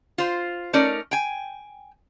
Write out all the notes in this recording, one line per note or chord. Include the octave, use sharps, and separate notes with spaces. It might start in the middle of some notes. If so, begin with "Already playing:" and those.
F4 C5
A3 C#4 D#4 A#4 D5
G5 G#5